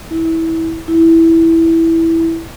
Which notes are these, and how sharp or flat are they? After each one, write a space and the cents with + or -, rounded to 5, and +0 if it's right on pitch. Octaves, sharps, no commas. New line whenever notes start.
E4 -20
E4 -5